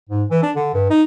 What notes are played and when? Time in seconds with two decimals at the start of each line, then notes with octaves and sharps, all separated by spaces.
0.09 G#2
0.30 E3
0.43 D4
0.55 D3
0.74 G2
0.90 D#4